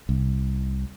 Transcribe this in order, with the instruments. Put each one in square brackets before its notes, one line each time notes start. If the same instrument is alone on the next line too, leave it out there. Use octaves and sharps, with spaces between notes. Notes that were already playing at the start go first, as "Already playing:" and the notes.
[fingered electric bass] C2